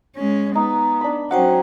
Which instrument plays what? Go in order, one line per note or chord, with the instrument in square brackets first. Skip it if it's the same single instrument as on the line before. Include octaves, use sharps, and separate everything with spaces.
[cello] G#3 C#4
[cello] B3 [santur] D#4
[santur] D4 B5
[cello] F#3 C#4 [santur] D#4 F#5 [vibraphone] F#4 C5 G5